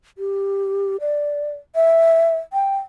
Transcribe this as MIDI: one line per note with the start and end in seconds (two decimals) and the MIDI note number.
0.18 0.97 67
1.01 1.52 74
1.76 2.36 76
2.53 2.77 79